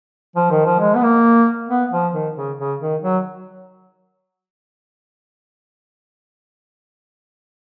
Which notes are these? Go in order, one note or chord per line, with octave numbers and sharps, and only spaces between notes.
F3
D#3
F3
G#3
B3
A#3
B3
F3
D#3
C#3
C#3
D#3
F#3